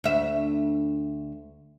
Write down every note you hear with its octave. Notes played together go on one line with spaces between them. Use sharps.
D2 E5